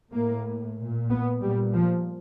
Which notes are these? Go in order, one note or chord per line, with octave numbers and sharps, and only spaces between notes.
A2 A#3
A#2
B3
A#2 G3
F3